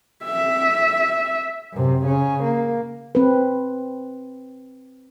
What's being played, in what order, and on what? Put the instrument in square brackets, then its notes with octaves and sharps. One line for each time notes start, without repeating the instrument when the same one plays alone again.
[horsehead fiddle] E5
[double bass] F#2 C3
C#3 C#4
A#3
[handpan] C4 B4